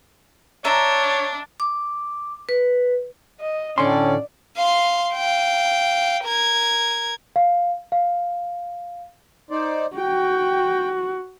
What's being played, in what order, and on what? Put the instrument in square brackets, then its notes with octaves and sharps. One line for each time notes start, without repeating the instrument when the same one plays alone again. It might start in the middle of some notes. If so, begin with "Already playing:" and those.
[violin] D4 [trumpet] C#5 [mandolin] E5 A#5
[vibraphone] D6
B4
[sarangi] D#5
[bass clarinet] A2 [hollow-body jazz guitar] D3 C6 [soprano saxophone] C#4 [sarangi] D5
[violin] F5 C6
F5 G5
A#4 G#6
[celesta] F5
F5
[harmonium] D#4 C5 D5
[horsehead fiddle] F#4 [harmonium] G5